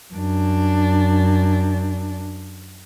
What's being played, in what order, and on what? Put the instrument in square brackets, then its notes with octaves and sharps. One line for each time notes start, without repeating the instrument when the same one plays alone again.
[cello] F#2 D4